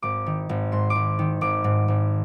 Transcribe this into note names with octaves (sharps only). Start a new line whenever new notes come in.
G#1 D6
D#3
G#1
G#2 C6
D6
G#1
D#3
G#1 D6
G#2
G#1